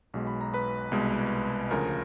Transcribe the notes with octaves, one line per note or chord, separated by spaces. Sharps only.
B1 B2 G#3
B5
A#5
B4 B5
C2 B2 G#3
D2 C#3 F3 A#4 A#5